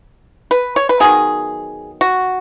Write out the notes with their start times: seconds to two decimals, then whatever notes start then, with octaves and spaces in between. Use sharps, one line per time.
0.51 B4
0.76 C#5
0.89 B4
1.00 D#3 F#3 B3 G#4
2.01 F#4